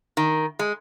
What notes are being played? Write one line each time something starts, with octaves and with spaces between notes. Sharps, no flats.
D#3
G#3